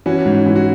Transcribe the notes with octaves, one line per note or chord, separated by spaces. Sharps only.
E3 C#4 F#4
G#2
E3
F#4